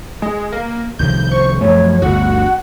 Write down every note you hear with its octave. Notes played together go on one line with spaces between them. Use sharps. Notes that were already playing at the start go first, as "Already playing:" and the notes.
G#3
A#3
C2 D#3 F3 G6
C5 C#6
F#2 F3 A3 C#5
G1 D2 F#4 F#5